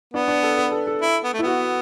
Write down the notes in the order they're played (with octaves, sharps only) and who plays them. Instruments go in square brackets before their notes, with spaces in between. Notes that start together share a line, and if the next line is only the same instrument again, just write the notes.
[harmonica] B3 [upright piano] D4
[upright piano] D4
A4
B4
A4
A4
[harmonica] E4
B3
A3
[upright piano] E4
[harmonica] B3 [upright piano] F#4